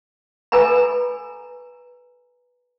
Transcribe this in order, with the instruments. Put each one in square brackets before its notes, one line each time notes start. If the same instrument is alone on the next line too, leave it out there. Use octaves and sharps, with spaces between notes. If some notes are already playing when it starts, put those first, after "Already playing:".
[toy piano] A4 B4 G#5 A#5 B5